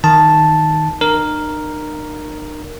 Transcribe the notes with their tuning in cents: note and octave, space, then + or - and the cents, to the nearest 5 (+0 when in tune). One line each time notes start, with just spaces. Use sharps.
D#3 +0 A5 +0
D#4 -45 A#4 +0